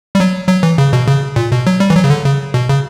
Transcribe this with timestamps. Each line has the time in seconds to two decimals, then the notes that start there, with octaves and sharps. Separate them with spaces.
0.15 G3
0.20 F#3
0.49 F#3
0.63 E3
0.78 C#3
0.93 B2
1.08 C#3
1.36 A#2
1.52 B2
1.67 F#3
1.80 G3
1.90 E3
1.96 F#3
2.04 C#3
2.10 D3
2.25 C#3
2.54 B2
2.69 C#3